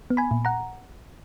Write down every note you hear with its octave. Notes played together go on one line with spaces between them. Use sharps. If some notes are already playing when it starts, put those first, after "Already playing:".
B3
G#5 B5
A#2
F#5 A#5